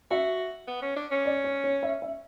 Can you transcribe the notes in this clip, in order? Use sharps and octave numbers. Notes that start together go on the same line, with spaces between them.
F#4 E5
B3
C#4
D4
C#4
D5
C#5
C#5
E5
E5